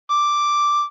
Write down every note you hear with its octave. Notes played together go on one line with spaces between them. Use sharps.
D6